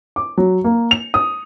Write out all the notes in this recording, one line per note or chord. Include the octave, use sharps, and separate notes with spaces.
D6
F#3
A#3
F7
D#6